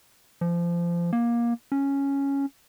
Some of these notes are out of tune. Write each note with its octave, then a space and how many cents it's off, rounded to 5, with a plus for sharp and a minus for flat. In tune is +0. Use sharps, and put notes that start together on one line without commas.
F3 -25
A#3 +20
C#4 +0